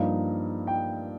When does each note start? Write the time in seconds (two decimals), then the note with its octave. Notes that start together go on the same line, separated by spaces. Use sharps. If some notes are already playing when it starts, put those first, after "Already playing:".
Already playing: G2 F3 A#3 D#4 F5
0.67 G5